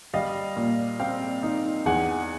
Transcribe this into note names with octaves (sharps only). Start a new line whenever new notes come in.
G3 D#5 F5
A#2
C4 F5 G5
D#4
E2 F#5 G#5